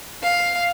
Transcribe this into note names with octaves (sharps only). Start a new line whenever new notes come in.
F5